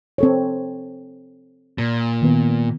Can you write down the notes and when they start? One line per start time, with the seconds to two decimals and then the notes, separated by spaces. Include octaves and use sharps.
0.18 C4 A4 C#5
1.78 A#2
2.22 D#3 B3